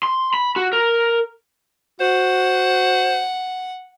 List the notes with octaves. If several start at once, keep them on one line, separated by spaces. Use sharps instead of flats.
C6
B5
F#4
A#4
F#4 C5 F#5